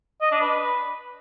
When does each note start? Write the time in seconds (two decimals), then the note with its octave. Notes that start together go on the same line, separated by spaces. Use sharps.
0.21 D#5
0.31 D4
0.41 B4